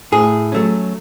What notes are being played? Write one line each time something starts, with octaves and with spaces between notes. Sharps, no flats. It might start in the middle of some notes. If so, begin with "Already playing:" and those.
A2 G#4
F#3 A3 C#4